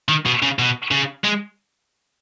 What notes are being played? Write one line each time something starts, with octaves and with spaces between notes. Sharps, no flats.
D#3
B2
C#3
B2
C#3
G#3